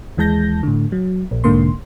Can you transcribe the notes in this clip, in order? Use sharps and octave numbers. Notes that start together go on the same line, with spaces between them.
D#2 E3 G#3 A5 G6 A#6
A2 D3
F#3
A#1
B1 G#2 D3 A#3 C6